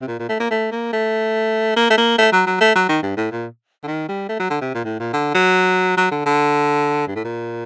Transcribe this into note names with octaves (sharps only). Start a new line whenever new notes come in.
C3
A#2
A#2
A3
A#3
A3
A#3
A3
A#3
A3
A#3
A3
F#3
F#3
A3
F#3
D#3
G2
A2
A#2
D3
D#3
G3
A3
F#3
D3
C3
A#2
A2
A#2
D3
F#3
F#3
D3
D3
G2
A2
A#2